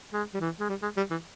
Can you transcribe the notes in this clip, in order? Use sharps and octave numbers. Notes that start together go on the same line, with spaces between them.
G#3
G3
E3
G#3
G3
G#3
G3
E3